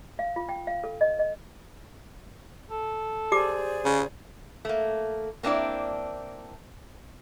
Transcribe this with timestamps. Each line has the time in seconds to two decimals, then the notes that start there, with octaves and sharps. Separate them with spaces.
0.19 F5
0.36 F4
0.49 G5
0.67 F5
0.84 A4
1.01 D#5
1.19 D#5
2.71 A4
3.32 G4 G#4 C5 D5 D6
3.85 C#3
4.65 A3 A#3
5.43 A#3 C4 D4 E4 D5